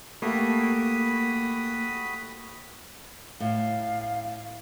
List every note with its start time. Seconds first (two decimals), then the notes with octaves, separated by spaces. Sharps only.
0.22 A3 A#3 F#4 G4 B5 D#6
3.40 A2 F5